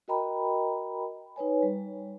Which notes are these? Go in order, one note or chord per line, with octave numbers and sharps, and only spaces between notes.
F#4 A#4 D#5 G5 A#5 B5
D#4 B4 C#5 G#5
G3